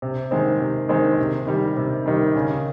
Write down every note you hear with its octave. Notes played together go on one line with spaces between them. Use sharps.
C3
D#3 G#3 C4
C3
D#3 G#3 C4
C3
D#3 G3
C3
D#3 G3
C#3